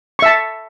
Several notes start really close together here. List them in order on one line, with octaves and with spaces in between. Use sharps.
C#6 E5 A5